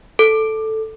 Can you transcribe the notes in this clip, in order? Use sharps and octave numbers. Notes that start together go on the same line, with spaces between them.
A4